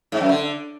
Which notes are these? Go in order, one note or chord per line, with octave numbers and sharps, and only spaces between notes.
G#2
F#2
D3